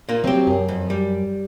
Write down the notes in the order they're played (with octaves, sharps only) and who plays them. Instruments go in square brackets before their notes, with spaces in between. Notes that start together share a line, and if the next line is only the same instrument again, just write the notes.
[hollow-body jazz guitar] A#2 A#3
[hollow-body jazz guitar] C2 G4 [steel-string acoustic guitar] F#3 C4
[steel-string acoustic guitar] F#2
[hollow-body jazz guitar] F2
G3